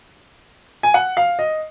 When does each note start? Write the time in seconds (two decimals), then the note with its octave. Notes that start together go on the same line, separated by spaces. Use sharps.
0.83 G#5
0.94 F#5
1.17 F5
1.39 D#5